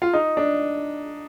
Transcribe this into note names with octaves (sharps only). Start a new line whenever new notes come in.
F4
D#4
D4